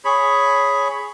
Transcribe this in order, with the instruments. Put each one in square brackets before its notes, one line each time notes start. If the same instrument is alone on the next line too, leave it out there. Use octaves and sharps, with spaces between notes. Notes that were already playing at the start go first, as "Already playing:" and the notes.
[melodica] G#4 C#5 B5